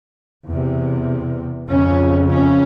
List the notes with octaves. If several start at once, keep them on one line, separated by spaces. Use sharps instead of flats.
E2 C3
F2 C#3 C#4
C#4